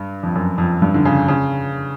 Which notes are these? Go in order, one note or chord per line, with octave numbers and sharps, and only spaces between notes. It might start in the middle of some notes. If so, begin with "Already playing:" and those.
Already playing: G2
F2
F#2
F2
G2
D3
C#3
C#3